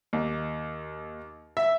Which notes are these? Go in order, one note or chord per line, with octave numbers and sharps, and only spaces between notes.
D#2
E5